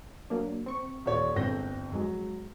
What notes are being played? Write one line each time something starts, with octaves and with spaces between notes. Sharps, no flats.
F#3 A#3 D4
C4 C#6
D#1 C#5 D5
G1 G#2 C4 G6 A#6
F2 G#2 F#3 G#3